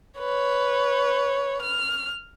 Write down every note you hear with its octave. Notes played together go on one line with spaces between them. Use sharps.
B4 C#5
F6